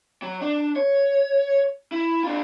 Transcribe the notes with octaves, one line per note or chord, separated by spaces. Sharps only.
F#3
D4
C#5
E4
D4 F4